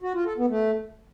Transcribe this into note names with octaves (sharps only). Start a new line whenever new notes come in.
F#4
F4
A4
B3
A3